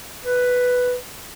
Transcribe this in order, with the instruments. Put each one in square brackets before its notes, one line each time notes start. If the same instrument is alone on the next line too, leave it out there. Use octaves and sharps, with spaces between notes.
[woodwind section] B4